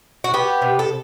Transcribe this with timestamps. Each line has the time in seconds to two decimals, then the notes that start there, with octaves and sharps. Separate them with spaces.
0.24 F#4
0.34 B3 G4
0.62 C3
0.79 A4